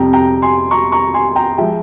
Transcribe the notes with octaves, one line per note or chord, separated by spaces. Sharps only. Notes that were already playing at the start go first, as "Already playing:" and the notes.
Already playing: F2 C3 G3 G5 A#5
G5 A#5
G#5 C6
A#5 C#6
A#5 C#6
G#5 C6
G5 A#5
F3 G#3 E5 G5